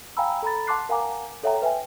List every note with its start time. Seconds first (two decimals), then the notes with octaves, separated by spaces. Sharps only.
0.17 F5 G5 G#5 A#5 B5 E6
0.42 A4 A#5 B5 A6
0.67 F#5 A5 C6 D6 F#6 C7
0.89 A#4 F5 F#5 G#5 A#5 D6
1.43 A4 C#5 E5 F#5 G5 A#5
1.62 B4 E5 G5 G#5